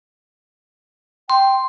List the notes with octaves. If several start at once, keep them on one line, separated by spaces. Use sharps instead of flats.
G5 C6